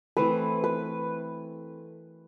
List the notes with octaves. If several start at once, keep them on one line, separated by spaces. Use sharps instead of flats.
E3 A3 C4 B4
B4